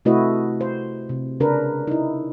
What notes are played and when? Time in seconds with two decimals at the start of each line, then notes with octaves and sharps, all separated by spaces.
0.05 C3 A3 E4 F#4 B4 D#5
0.61 C5
1.09 C3
1.40 C#3 D4 A#4 B4
1.87 D#4 E4